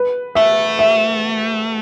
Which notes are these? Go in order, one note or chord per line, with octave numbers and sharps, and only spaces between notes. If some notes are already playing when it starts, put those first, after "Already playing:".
Already playing: B4
A3 E5
E5